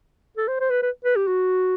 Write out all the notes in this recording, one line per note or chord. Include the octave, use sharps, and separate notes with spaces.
A4
C5
C5
B4
B4
B4
G4
F#4